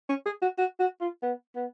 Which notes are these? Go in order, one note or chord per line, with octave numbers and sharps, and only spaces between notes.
C#4
G#4
F#4
F#4
F#4
F4
B3
B3